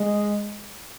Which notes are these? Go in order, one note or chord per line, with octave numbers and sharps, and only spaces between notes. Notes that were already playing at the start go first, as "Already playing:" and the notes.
Already playing: G#3